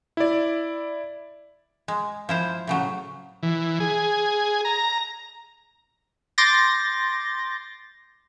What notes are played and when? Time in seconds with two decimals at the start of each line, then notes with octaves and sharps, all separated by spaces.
0.17 E4 D5
1.88 G#3
2.29 F3 E4 C5
2.67 A2 C#3 F#3
3.43 E3
3.80 G#4
4.65 A#5
6.38 C6 D6 G6 A6 A#6